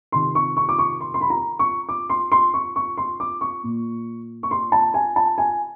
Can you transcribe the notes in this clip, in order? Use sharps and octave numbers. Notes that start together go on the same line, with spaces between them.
C3 D#3 C6
C#6
C#6
D6
C#6
C6
C6
B5
A#5
C#6
D6
C6
C6
C#6
C#6
C6
D6
C#6
A#2
C#6
C6
A5
G#5
A5
G#5